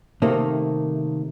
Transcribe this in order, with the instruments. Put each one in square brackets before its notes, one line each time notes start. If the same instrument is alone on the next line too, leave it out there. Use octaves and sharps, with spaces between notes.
[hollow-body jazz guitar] C3 D#3 A3 A#3